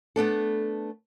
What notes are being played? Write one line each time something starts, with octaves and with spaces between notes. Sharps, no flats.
A3 B3 D4 A4